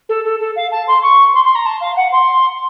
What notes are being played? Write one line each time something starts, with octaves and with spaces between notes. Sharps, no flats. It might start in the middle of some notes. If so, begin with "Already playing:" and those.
A4
A4
A4
F5
A5
C6
C#6
C6
C6
A#5
A5
F5
F#5
C6